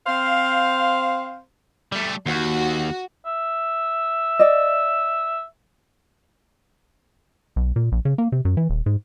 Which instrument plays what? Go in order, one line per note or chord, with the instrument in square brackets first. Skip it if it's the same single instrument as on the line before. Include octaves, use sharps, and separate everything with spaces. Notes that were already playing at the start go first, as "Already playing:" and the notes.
[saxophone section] C4 C5 F5
[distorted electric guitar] G3 A3
[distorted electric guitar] D#2 [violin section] F#4
[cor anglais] E5
[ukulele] D5 D#5
[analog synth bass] B1
A#2
A#1
C#3
A#3
C3
F#2
E3
D#1
G#2